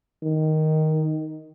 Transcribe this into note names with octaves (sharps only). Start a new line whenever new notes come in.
D#3